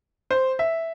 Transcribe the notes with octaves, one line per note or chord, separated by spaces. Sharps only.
C5
E5